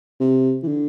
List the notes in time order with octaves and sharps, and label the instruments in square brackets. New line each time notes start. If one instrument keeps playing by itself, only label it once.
[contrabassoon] C3
E3
D3